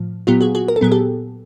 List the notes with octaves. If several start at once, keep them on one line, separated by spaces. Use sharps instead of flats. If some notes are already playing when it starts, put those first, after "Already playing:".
Already playing: A2 F3
A#2 F#3 B3 F4 G4
F#4 G#4
F#4 G#4
A#4
A4
A#2 F#3 B3 G#4
G4 A4